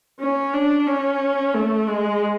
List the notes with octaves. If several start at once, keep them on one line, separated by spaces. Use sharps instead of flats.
C#4
D4
C#4
A3
G#3